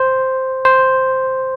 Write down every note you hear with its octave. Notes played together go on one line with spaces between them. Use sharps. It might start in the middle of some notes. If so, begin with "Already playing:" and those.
Already playing: C5
C5